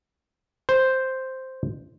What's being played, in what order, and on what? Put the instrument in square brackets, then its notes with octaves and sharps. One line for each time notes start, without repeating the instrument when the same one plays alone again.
[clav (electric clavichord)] C5